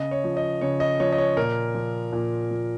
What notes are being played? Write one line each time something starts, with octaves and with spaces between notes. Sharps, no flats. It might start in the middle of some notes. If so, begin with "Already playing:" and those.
Already playing: C#3 D#5
C#5
F3
D#5
C#3 C#5
D#5
F3 C#5
D#5
C#5
A#2 A#4
F3
A#2
F3